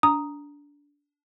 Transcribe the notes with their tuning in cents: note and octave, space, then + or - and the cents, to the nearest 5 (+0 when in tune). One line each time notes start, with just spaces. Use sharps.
D4 -20 A#5 +0 D#6 +0